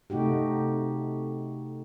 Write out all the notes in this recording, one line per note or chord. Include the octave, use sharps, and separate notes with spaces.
C3 A3 D#4 F#4 G4